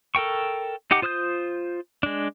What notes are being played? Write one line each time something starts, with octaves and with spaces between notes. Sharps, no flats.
A4 A#4 G5 C#6
D#4 G4 F#5 D6
F4 C5 D#6 F6 G6
G#3 D4